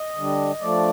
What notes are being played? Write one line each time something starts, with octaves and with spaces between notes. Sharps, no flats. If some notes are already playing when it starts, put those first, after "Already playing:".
Already playing: D#5
D3 G3 D4
F3 A3 D4 D5